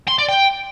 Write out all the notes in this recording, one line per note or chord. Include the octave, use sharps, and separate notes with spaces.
C6
D5
G5